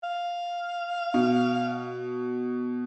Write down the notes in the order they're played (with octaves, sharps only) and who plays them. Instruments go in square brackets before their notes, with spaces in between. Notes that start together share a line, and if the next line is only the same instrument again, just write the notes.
[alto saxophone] F5
[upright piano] B2